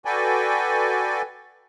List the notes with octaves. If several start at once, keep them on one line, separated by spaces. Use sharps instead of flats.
F#4 A4 B4 D5 G5 G#5